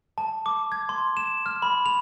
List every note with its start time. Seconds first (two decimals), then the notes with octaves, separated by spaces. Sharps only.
0.18 A5
0.46 D6
0.72 G#6
0.89 C6
1.17 E7
1.46 F6
1.62 B5
1.86 F7